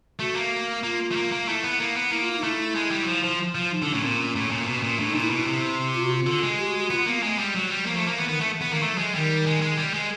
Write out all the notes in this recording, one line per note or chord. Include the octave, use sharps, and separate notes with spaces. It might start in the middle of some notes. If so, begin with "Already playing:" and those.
A3 F#4
A#3
A#3 F4
A3
A#3
A#3
A3 E4
B3
A#3
B3
A#3 E4
F4
F4
D#4
A3 E4
G#3
G3
F#3
F3
F3
F3
D#4
D3 D4
A2 C#4
A#2 C4
C#4
A2
A#2
B2
A#2
A2 D4
D#4
A#2
E4
B2
C3
F4
F#4
F4
D3
G#3
G4
F#4
F#4
B3 F4
A#3 B3
G#3 A3
G3 G#3
F#3 G3
F#3 G3
F3 A#3
A3
A#3
E3 B3
D#3 B3
E3 A3
E3 B3
D#3 A#3
E3 A3
F#3
G#3
D#3 G3
G#3
G#3
G3
G#3